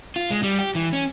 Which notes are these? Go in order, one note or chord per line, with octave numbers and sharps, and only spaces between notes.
F4
G#3
G3
G4
E3
C#4